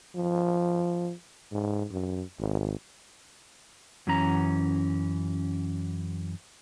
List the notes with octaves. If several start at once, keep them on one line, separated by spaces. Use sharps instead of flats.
F3
G#2
F#2
G#1
F#2 E3 C#4 A#5